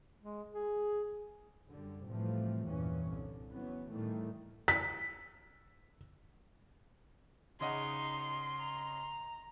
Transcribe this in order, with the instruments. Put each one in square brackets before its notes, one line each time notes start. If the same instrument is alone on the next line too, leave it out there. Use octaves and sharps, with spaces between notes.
[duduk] G#3
G#4
[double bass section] F#2 D3 G3
A2 C3 E3 F3 G3 A3
E2 G2 A#2 E3 C#4
C2 D3
E3 F#3 B3 C#4
A2 D#3 E3 G3 A3
[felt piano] B6
[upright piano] C#3 D#5 F#5 [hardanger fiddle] D#4 [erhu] C6
[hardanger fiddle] A#5